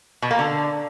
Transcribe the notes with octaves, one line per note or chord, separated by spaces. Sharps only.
B2
A#3
D3